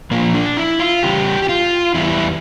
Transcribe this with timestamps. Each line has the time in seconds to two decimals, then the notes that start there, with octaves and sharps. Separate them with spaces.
0.11 A#2 F3 A#3
0.34 D4
0.57 E4
0.79 F4
1.03 E2 C#3 G3 G4
1.42 G4
1.49 F4
1.94 E2 E3 G3 E4